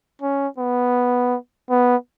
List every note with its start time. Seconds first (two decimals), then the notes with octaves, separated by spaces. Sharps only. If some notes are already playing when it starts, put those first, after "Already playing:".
0.22 C#4
0.58 B3
1.70 B3